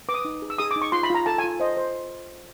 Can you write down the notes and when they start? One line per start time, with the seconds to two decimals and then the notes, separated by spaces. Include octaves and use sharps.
0.09 B4 D6
0.14 D#6
0.25 D#4
0.42 G#4
0.50 E6
0.58 G#4 D#6
0.71 D6
0.76 D#4
0.82 C#6
0.92 F4 C6
1.03 B5
1.10 F4 A#5
1.26 A4 A5
1.38 G#5
1.44 F4
1.60 C5 D#5
1.77 C5